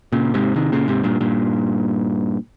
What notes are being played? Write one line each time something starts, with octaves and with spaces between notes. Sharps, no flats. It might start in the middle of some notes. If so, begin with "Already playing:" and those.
A#2 C#3
G#2 C3
C3 D#3
A#2 C#3
G#2 C3
G2 A#2
G2 A#2